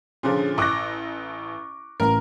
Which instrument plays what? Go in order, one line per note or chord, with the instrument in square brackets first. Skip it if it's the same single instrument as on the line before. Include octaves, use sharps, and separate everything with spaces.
[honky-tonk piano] A#2 D3 F3 [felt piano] C#4 G#4
[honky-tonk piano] A1 A#6 [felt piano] C#6 D6 F#6
[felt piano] A1 A#5 [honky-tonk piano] A#4